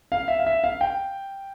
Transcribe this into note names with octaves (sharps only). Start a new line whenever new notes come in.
F5
E5
F5
E5
F5
G5